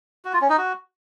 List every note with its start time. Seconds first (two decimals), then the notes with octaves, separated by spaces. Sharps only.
0.25 F#4
0.33 F4
0.41 C#4
0.50 D#4
0.58 F#4